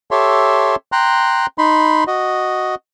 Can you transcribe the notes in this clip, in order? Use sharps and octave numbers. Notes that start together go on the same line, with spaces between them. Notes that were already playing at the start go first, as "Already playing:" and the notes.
G4 A4 C#5 E5 C6
G5 A#5 C6 F#6
D#4 B5 C6
F#4 D#5